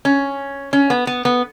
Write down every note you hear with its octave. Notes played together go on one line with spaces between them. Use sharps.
C#4
C#4
B3
B3
B3